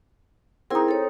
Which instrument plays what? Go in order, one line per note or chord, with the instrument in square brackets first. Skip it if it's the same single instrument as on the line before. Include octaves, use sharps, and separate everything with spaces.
[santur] C4 D#4 [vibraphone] E4 G#4 A#4
[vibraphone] A4 C#5